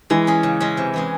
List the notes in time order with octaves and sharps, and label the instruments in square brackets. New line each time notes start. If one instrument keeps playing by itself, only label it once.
[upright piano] E3 [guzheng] G#3
[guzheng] C#4 G#4
C#3
G#3 C#4
C3
E3 G#3 C#4 G#4